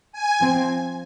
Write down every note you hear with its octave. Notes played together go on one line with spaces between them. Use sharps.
G#5
F3 C4